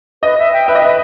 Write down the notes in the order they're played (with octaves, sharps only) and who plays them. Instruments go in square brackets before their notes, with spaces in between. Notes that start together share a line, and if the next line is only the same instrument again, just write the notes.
[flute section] B4 [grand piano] D#5
[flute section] E5
G5
[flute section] B4 [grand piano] E5
[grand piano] D#5
[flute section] B4 [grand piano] E5